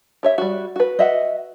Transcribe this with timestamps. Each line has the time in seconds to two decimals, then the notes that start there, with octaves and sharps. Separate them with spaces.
0.23 G4 C#5 E5
0.38 G3 F#4
0.76 F#4 B4
0.99 D#5 E5 F#5